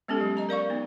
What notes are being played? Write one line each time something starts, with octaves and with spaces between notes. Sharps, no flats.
G#3 B3 C#4 G4 A4
F#3
D#5 A#5
A#4 D5 F5 C#6
B3 D#4